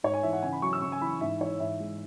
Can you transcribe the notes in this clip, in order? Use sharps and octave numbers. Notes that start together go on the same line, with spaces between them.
G#2 C#5
G#5
E3 E5
F#5
C#3 G#5
B5
F#3 C#6
E6
C#3 C#6
G#5
E3 B5
G#2 E5
E3 C#5
G#2 E5
G#3